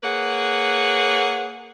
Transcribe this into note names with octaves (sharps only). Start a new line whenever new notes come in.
A#3 G#4 B4 C#5 F#5